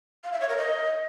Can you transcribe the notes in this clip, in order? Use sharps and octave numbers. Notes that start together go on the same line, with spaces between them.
F5
E5
C#5
A#4
D#5